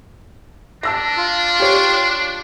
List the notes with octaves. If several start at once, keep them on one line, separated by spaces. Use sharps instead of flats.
D4 A5 E6 A#6
F4
G4 C#5